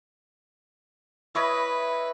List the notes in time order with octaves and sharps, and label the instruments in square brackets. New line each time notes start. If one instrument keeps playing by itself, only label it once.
[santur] E4 C#5 D#5 [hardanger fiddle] B4